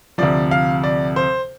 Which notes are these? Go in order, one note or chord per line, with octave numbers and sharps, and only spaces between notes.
D2 C3 F3 D5
F5
D5
C5